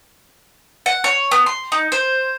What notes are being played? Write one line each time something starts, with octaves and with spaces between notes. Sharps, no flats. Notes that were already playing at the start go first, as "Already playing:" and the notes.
F#5
C#5
B3
C6
D#4
C5